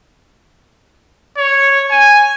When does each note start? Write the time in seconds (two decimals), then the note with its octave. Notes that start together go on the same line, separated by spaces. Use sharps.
1.38 C#5
1.91 G#5